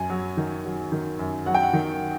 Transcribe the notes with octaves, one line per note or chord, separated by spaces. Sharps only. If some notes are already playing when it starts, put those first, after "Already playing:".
Already playing: F#2 G#5
F#3
D#3
F#3
D#3
F#2
F#3 F#5
G5
F#5
D#3